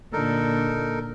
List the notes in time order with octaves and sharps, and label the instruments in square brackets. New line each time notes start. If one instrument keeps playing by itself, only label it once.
[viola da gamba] A#2 D3 [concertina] D#4 A4 A#4